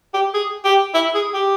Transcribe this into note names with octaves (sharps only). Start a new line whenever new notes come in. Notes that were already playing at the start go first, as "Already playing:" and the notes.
G4
G#4
G4
E4
G#4
G4